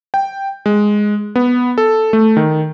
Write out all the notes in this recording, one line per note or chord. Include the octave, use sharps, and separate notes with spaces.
G5
G#3
B3
A4
A3
D#3